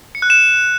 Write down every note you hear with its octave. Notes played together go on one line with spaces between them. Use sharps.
C#7
F#6
E7